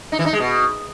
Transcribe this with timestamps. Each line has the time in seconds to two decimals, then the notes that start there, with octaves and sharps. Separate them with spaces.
0.12 D#4
0.19 E3
0.26 D#4
0.33 G#3
0.40 B2